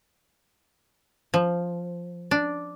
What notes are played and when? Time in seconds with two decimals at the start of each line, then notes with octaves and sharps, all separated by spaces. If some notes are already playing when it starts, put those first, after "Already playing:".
1.34 F3
2.31 D4